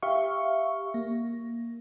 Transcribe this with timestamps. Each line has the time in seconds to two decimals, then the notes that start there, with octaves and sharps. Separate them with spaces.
0.03 G4 E5 F5 C#6
0.94 A#3